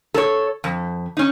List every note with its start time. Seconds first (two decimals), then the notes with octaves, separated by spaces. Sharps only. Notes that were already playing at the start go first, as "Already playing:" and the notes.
0.14 A4 C#5
0.64 F2
1.17 C#4 D#4